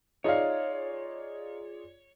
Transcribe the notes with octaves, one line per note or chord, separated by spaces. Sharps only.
D#4 F4 G#4 C#5 D5 F5